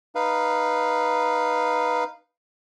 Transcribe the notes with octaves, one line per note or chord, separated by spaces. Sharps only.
D#4 B4 F5